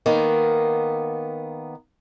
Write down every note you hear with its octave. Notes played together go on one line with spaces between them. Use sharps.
D#3 A#3 B3